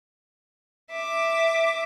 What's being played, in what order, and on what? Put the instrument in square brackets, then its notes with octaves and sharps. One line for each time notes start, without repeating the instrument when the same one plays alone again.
[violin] E5 D6